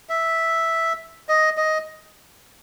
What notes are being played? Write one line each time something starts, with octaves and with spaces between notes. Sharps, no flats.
E5
D#5
D#5